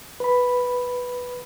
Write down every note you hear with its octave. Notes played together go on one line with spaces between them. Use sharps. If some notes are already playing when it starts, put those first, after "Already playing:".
B4 B5